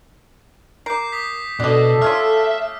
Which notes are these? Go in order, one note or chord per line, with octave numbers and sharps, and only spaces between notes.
A#4 D6 G6 C7
D#6 B6
B2 D4 A4 D#5
A3 C#4 F4 E5 F6